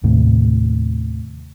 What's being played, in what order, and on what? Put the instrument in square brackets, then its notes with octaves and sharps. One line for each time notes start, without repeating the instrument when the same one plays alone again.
[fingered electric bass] D#2 A2 C3